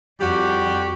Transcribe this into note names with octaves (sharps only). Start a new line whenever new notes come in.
F2 G3 F#4 G4